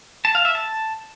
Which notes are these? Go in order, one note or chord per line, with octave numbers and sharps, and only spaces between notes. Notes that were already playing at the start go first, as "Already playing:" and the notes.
A5
F5
E5
A5